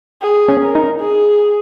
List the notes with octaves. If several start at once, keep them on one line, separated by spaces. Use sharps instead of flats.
G#4
C#4
A#4
D#4
G#4